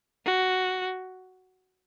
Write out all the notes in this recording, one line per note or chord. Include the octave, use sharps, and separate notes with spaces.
F#4